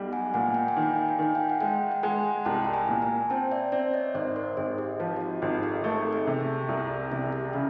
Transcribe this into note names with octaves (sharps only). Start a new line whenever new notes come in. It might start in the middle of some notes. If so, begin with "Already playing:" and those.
Already playing: B1 G3
F#5 G#5
A#2 F#5 G#5
G5
G#5
D#3
G5
G#5
G5
D#3 G#5
F5 G5
F#5
G#3 F5 G5
G5
G#3 F#5 G#5
C2 G5 A5
A5
G#5 A#5
A#2
G#5 A#5
C4 G5 A5
D5 E5
C4 D5 E5
C#5 D#5
G#1 C5 D5
A#4 C5
G#1 G#4
G4
F3 F4
G4
F#4
G#1 G#4
G4 A4
A3 G#4 A#4
G#4
C3
G4
C2 G#4
C3 G#4
G4
C#3 G4